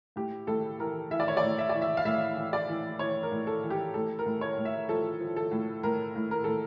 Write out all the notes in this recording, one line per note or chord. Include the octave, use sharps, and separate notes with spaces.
A2 G4
A2 A4
E3 A#4
E3 E5
D5
C#5
D5
A2
E5
E3 D5
E5
F5
A2 E5
E3
D5
E3
E3 C#5
A#4
A2
A4
E3
G4
A2 A4
A#4
A2
C#5
A2
E5
F3 A4
F3
A4
A2
A2 A#4
A2
A#4
A2 A4